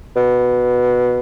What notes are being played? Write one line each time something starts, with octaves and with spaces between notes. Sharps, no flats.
B2